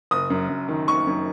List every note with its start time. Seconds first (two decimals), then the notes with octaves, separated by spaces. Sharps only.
0.11 F#1 D#6
0.30 F#2
0.49 F#2
0.69 D#3
0.87 D#3 C#6
1.07 F#2